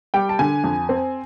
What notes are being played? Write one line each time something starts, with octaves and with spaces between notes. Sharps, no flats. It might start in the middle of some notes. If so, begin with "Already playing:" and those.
G3 G5
A5
D3 G#5
F2
C4